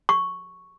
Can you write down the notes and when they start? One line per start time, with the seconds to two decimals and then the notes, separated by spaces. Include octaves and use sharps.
0.09 C#6